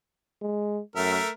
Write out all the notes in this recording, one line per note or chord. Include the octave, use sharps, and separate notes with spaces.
G#3
F#2 A3 A#4 E5